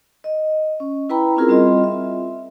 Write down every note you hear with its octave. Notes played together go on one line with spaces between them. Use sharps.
D#5
C#4
E4 B4 G5 A#5 B5
C4 C#4 E4 F4 G#4 A#4
G3 C4 F4 D#5 C6
E5